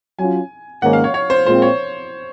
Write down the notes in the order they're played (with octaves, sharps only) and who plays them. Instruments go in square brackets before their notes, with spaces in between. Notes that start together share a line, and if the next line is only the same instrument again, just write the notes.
[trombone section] F#3 C#4 F4 [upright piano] G#5
[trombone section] G#2 D#3 A#3 C#4 [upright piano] F#5
[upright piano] F5
C#5
C#5
C5
[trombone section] A#2 G#3 C4 F4 [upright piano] C5
[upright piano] C#5